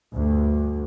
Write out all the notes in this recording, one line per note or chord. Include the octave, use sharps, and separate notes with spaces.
D2 G2